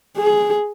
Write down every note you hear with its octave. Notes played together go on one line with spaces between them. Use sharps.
G#4